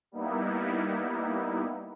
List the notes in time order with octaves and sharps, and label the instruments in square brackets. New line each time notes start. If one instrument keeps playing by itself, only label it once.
[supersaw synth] G3 A#3 B3 D#4 E4